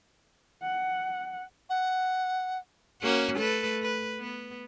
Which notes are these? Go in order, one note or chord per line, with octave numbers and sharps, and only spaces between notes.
F#5
F#5
A#3 C#4 F#4
A3 A4 B4
B4
B3